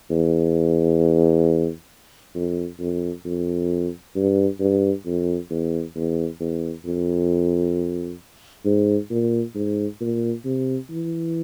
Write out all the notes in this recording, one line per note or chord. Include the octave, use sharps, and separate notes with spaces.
E2
F2
F2
F2
G2
G2
F2
E2
E2
E2
F2
G#2
A#2
G#2
A#2
C3
E3